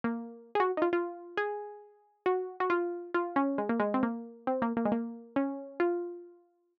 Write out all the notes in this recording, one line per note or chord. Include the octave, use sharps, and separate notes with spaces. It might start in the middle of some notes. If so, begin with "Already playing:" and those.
A#3
G#4
F#4
D#4
F4
F4
G#4
F#4
F#4
F4
F4
C#4
G#3
A#3
G#3
C4
A#3
C4
A#3
A#3
G#3
A#3
C#4
F4